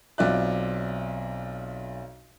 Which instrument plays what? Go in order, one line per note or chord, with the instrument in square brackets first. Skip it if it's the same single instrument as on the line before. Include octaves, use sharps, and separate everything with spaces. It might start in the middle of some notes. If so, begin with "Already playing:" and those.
[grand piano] B1 C4 F4 D5 E5 F#6